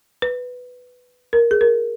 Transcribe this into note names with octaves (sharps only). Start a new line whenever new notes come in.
B4
A#4
G#4
A#4